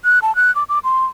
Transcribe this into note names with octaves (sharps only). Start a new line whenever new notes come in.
F#6
A5
F#6
D6
D6
C6